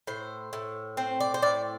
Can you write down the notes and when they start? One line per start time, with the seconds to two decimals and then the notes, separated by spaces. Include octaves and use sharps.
0.07 A2 C5
0.53 A2
0.97 C4 C5
1.20 D5
1.34 C5
1.42 A2 D5